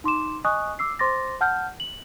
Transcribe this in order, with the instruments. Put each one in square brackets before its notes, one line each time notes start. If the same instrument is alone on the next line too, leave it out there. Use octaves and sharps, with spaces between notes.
[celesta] D#4 C6 D6 E7
D#5 G#5 C#6 D#6 F#6
D6 E6 C7
C5 C6 D6 A6 A#6
F#5 A5 F6 G6
F#7